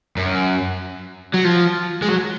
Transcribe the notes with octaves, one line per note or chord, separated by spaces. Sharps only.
F#2
F#3
F3
G#3
F#3